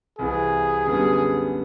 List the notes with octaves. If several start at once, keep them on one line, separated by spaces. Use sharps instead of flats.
C2 C3 E3 G#4
F#2 D3 G3 B3